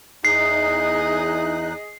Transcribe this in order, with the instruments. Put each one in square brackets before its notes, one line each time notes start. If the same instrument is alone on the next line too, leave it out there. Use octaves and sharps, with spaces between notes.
[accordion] E2 D#4 F#6 [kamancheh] G#4 D#5 [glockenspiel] C7